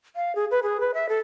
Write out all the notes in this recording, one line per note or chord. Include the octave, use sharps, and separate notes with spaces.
F5
G#4
B4
G#4
B4
E5
A4